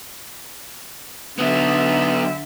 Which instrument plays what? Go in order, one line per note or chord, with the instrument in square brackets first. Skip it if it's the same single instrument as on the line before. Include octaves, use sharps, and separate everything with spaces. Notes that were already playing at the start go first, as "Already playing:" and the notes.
[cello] D3 E5 [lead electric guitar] F#3 B3